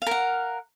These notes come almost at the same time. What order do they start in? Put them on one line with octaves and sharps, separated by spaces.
F5 A#4 F#5